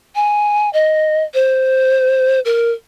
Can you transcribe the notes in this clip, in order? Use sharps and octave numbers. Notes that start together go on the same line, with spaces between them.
G#5
D#5
C5
A#4